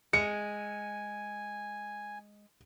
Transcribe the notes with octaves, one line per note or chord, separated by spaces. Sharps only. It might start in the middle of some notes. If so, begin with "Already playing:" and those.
G#3 G#5 C#7